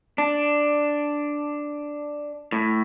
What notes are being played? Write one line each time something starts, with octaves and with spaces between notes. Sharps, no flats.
D4
A2